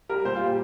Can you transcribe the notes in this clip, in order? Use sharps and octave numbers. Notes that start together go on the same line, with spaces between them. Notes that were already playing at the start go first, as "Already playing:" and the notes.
G3 A#4
A#2 C5
F4
G3
G4